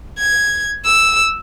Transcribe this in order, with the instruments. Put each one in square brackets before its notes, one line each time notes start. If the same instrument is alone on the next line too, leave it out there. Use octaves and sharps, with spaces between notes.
[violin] G#6
E6